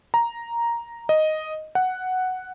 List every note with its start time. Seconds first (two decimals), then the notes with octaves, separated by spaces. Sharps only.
0.14 A#5
1.09 D#5
1.75 F#5